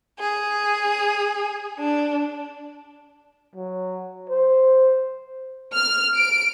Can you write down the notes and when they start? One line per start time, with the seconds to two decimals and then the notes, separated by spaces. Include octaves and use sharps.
0.21 G#4
1.79 D4
3.55 F#3
4.29 C5
5.75 F6
6.17 D7